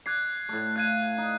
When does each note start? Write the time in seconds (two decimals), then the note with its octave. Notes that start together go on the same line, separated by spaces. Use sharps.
0.06 D6 F#6 G#6 C7
0.49 A2 A3
0.76 F5 F#6 G#6 D#7
1.18 D#4